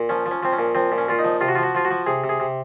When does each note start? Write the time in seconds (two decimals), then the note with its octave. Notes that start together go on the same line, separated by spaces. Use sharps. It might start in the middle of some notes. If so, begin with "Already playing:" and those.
Already playing: A#2
0.09 F3 C#4
0.26 F3
0.31 C#4
0.43 F3 C4
0.53 C#4
0.59 A#2
0.75 F3 C4
0.92 A#2
0.98 C#4
1.08 A#2 F4
1.19 D#4
1.24 F3
1.41 C3 F4
1.48 F#4
1.55 F4
1.58 F3
1.63 F#4
1.75 F3 F4
1.85 F#4
1.91 F3
2.07 C3 G#4
2.24 C3
2.29 G#4
2.40 C3